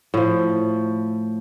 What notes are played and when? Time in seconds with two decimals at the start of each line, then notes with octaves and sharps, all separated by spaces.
0.14 A2 F3